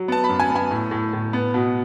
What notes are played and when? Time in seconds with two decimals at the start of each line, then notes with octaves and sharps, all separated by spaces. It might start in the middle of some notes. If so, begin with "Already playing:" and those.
Already playing: F#3
0.08 B3 A5
0.24 B5
0.29 F#2
0.40 G#5
0.50 B3
0.56 G#5
0.71 A2
0.91 A2
1.13 A2
1.33 B3
1.54 B2